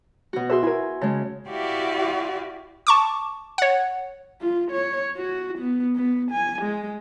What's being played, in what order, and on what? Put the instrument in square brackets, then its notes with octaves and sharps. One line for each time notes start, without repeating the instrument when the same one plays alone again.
[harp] B2 F#4
[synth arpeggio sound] F#4 G#4 B4 [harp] E5 C6
[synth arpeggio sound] E4 A#4 [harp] G#5
[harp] C#3 G#3 [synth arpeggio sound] A5
[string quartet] E4 F#4 G4 D5 E5 F5
[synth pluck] A5 C#6 D6
C#5 F#5
[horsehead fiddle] F4
C#5
F#4
B3
B3
G#5
G#3